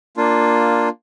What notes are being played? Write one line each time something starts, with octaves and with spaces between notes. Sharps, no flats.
A#3 D4 F4